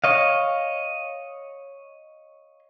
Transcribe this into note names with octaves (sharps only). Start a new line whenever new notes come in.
C#5 D#5 F5